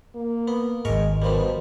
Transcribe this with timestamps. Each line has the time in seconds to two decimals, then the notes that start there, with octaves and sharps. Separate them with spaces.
0.15 A#3
0.48 B3
0.85 G#1 G#2 G#3 A#4 C#6
1.22 B2 F3 G3 A#4